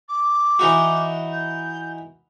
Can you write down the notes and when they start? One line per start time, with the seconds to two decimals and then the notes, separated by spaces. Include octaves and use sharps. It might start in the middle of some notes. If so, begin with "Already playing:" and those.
0.09 D6
0.59 E3 D#4 F#4
1.33 G6